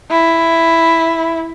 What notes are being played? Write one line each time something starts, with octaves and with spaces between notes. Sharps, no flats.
E4